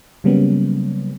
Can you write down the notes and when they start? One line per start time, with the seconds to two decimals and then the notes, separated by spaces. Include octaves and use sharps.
0.24 C#3 F#3 G3 A#3 B3 C#4